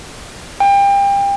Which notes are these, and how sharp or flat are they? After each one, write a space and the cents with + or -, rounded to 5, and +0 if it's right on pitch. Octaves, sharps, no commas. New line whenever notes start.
G5 +30